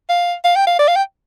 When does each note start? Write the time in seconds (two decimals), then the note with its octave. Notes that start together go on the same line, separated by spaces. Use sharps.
0.09 F5
0.44 F5
0.56 G5
0.67 F5
0.79 D5
0.88 F5
0.96 G5